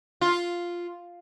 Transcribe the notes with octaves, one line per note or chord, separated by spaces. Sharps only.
F4